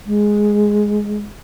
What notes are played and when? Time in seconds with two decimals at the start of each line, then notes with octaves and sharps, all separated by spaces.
0.06 G#3